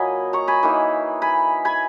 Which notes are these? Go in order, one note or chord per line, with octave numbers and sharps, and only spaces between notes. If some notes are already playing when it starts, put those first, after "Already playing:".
Already playing: A#2 F#3 A#3 D#5 G#5 B5
A#5 C#6
G#5 B5
E3 A#3 D#4
G#5 B5
G#5 B5